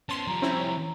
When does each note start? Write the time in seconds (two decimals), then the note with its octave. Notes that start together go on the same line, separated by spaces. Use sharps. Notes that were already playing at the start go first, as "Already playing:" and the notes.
0.09 B3 C#4 A5 C6
0.28 F3 G3 A#5
0.42 C4 C#4 E4